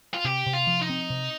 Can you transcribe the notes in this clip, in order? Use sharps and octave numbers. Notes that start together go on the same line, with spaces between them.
F4
C3 G4
C3
F4
F3
D#4
C4
C3